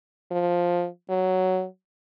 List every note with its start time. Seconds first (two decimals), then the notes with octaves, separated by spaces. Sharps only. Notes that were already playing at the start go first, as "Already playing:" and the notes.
0.31 F3
1.10 F#3